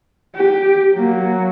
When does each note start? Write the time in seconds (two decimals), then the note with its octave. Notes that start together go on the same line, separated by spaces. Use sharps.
0.35 G4
0.95 F#3 A#3